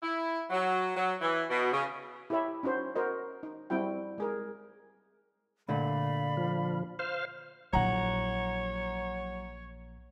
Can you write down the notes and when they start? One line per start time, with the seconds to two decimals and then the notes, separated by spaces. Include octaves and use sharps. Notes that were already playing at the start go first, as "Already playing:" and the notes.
0.02 E4
0.50 F#3
0.95 F#3
1.22 E3
1.50 B2
1.72 C#3
2.30 E4 G4 A4 C#5 E5 B5
2.63 C#4 D#4 F#4 C5
2.95 F#4 A#4 C5 D#5
3.43 D#4
3.70 G3 C4 E4 F#4 G5
4.18 G#3 G#4 A#4
5.69 A#2 D3 A3 D5 F5 B5
6.37 F3
6.99 C5 F5
7.73 A#1 F#3 E4 C#5 F#5 A#5